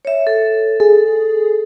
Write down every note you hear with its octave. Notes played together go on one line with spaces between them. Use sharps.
C#5 E5
A4
G#4 A4